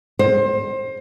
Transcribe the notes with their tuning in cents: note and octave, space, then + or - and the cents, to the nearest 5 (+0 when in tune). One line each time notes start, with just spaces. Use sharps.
C5 +25